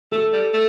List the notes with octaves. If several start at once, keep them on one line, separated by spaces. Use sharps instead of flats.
A3 A4
G3
A3